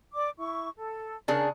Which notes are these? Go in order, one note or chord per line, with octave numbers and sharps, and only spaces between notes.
D5 D6
E4 C#6
A4
C#3 D4 G#4 A#4